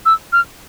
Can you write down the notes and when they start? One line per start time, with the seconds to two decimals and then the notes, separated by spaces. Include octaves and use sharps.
0.06 E6
0.33 F6